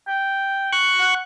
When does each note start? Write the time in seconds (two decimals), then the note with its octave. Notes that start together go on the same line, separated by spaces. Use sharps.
0.08 G5
0.73 C#6 F#6
1.00 F#5